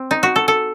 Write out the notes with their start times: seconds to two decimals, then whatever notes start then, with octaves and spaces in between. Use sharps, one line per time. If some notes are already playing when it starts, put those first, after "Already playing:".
Already playing: C4
0.11 D#4
0.23 F#4
0.36 A4
0.48 A4